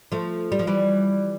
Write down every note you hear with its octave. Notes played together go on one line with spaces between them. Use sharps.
F3 A3
G3
F3
E3 G3